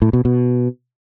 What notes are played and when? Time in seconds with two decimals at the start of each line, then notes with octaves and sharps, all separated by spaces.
0.02 A2
0.13 B2
0.25 B2